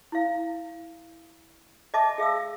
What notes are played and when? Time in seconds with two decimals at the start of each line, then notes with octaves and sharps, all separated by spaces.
0.12 E4 F5
1.94 D#5 E5 A5 D6
2.18 G#4 E5 F5 E6